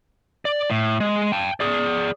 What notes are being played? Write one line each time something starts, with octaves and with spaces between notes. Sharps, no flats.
D5
A2
G#3
G5 A5
G#4 D5